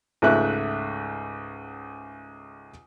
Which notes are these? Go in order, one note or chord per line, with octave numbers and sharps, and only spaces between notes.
C#2 G#2 C#3 A3 E5 F#6